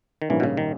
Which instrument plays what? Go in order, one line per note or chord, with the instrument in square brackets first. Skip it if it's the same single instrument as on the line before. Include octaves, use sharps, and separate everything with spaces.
[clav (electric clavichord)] D#3
[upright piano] A#1 G#2 G3 A#3 C#4 [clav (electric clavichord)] E3
[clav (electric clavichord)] B2
C#3
D#3